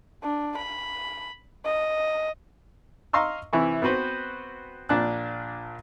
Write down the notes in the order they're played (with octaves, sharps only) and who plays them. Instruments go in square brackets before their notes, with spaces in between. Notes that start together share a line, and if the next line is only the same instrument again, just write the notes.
[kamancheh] D4
B5
D#5
[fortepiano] D#5 F5 A#5 C6 C#6 E6
C3 E3 E4 C#6
B3 C4 F#4 B4 C5
A#1 A#2 D4 A5 F#6